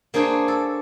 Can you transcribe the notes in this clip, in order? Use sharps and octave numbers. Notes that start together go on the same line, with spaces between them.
A#3 D4 G#4 C5 C#5
A4